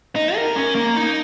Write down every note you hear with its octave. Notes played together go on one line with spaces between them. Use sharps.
D#4
A#4
C#4
A#3
D#4